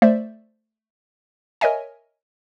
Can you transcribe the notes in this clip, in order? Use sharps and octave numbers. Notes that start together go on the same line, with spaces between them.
A3 C5 D5 E5
A#4 C#5 D#5 E5 G#5